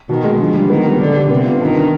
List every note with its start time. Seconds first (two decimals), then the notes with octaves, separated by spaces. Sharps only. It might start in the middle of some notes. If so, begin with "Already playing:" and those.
0.09 B2 D#3
0.24 G#3
0.39 D3 F3
0.55 G3
0.70 D#3 B3
0.85 G3
1.00 D3 D4
1.15 G4
1.30 C3 B3
1.45 F4
1.61 G2 D#3
1.76 D4